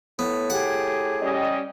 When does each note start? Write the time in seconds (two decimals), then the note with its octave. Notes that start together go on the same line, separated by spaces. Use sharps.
0.19 A2 B3
0.50 G4 G#4 F#5
1.22 G3 C#4 D#5